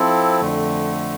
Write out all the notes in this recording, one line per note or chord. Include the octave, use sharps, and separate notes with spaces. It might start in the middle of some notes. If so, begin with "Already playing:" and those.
Already playing: F3 C4 E4 A4
F2 D3 A3